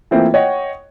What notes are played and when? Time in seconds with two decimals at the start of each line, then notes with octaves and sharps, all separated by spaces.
0.11 E3 A3 A#3 C4 E4 F4
0.34 C#5 D#5 F#5 G5 C#6